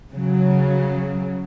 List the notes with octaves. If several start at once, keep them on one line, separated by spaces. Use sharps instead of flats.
C#3 F#3